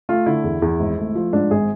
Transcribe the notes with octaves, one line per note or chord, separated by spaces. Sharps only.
A3 F4
D3 E4
E2
E2
G#1
A3
F3
G#2 D4
G#1 G#4